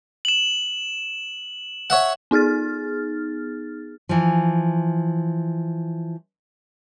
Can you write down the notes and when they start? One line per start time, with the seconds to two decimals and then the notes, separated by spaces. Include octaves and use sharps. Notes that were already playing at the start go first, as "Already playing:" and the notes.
0.25 E7 F#7
1.90 C#5 E5 F#5
2.31 B3 D#4 G#4 F6 A6
4.09 E3 F3